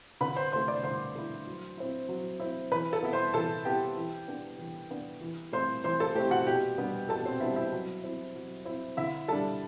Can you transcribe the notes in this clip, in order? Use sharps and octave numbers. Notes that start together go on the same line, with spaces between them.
D3 B4 B5
C5 C6
A3 E4 C5 C6
D5 D6
D3 C5 C6
A3 E4
F#3
C4 E4
F#3
C4 E4
E3 B4 B5
A4 A5
B3 E4
C5 C6
E3 A4 A5
B3 E4 G4 G5
E3
B3 D4
E3
B3 D4
E3
A3 C4 E4 C5 C6
E3 C5 C6
A4 A5
A3 C4 E4 G4 G5
F#4 F#5
B2 G4 G5
G3 B3 D4
B2 A4 A5
C4 C5
G3 B3 D4 E4 E5
E4 E5
F#3
C4 E4
F#3
C4 E4
D3 E4 E5
G3 D4 A4 A5